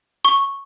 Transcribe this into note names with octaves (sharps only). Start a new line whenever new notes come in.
C#6